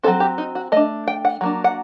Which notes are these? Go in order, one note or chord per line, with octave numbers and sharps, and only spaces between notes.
F#3 A3 C4 A4
G4
D#4
F#4
A3 D4 D#5
G5
F#5
F#3 A#3 D4
F#5